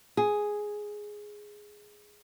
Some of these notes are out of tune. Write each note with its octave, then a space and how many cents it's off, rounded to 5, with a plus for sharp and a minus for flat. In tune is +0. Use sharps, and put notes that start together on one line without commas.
G#4 +0